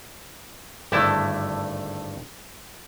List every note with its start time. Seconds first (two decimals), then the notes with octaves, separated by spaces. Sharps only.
0.92 G#1 G2 D3 A3 E4 A5